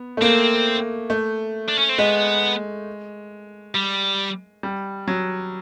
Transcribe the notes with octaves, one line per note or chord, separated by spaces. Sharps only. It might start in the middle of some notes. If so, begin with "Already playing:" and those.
Already playing: B3
A3
A#3 C4
A3
D4
C#4
C4
G#3 B3
G3
G3
F#3